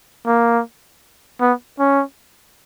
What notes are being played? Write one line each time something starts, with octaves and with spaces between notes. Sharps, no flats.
A#3
B3
C#4